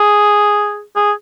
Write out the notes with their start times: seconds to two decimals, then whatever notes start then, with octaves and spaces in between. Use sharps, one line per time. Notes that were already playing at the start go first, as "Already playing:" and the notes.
Already playing: G#4
0.96 G#4